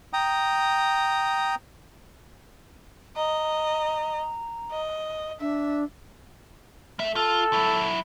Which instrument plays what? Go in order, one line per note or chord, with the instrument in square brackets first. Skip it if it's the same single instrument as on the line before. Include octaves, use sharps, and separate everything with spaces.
[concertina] G5 A#5 D#6
[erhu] D#5 [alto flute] A#5
[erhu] D#5
[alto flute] D4 [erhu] E5
[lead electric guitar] A3 E5
[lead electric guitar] F4 [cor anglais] A4
[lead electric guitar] F#3 E4